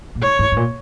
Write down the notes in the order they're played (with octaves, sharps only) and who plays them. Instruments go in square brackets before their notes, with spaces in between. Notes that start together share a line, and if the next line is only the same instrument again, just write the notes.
[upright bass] A#2
[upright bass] G#2 [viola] C#5
[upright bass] G#2
G#2
A#2